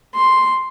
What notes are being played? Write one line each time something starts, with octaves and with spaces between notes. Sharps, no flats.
C6